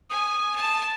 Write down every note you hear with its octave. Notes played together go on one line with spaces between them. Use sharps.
G#5 D#6
A5